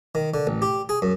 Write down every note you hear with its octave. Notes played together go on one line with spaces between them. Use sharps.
D#3
D3
A1
G4
G#4
F#2